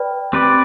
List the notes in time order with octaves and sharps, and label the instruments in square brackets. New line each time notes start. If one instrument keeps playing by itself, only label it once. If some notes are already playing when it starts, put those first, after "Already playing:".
Already playing: [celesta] B4 D5 G5 B5
[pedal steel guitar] C4 G4 B4 D5